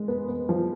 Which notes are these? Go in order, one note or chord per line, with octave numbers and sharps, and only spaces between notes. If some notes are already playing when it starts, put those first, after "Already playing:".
Already playing: G#3
B3
B3
F3